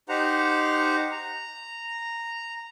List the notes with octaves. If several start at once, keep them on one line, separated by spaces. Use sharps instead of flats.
D#4 G4 C5 F#5 A#5
A#5